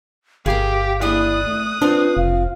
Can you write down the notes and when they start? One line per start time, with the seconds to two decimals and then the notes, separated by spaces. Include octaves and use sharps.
0.46 G1 G4 G#4 A#4 F5
1.01 D#2 D4 E4 G#4 D#6 F#6
1.45 A3
1.82 C4 D4 F4 B4
2.17 F1 F5